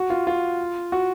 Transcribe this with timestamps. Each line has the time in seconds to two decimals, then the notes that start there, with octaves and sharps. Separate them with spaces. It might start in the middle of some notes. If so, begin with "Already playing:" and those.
Already playing: F#4
0.10 F4
0.27 F4
0.92 F#4